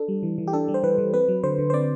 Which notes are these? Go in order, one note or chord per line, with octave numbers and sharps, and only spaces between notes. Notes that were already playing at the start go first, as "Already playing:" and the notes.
Already playing: D4 A4
G3
E3
E3
G4
D4 A4
G3
C5
E3 B4
E3
C4 B4
F#3
D3 C5
D3
C5
C4 D5